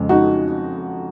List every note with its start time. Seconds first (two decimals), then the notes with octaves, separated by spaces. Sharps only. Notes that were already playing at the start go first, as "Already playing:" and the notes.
Already playing: F2 C#3 G#3
0.09 D#4 F#4